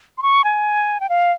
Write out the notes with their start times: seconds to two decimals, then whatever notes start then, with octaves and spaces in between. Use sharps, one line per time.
0.18 C6
0.23 C#6
0.44 G#5
1.00 G5
1.09 F5